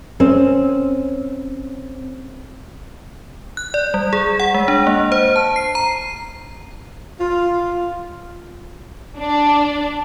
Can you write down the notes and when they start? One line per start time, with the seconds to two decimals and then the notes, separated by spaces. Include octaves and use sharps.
0.20 C4 C#4
3.57 F#6
3.74 D5
3.94 G3
4.13 G#4
4.40 F#5
4.54 G#3
4.68 D4
4.87 A#3
5.12 C5
5.36 A5
5.56 C7
5.75 A#5
7.19 F4
9.17 D4